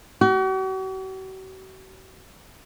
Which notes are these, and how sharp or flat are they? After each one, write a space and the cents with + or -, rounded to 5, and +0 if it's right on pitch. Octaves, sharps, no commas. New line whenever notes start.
F#4 +45